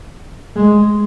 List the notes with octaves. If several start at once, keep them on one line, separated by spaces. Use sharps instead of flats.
G#3